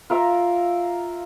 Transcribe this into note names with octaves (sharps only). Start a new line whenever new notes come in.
F4 A#4 E5 A#5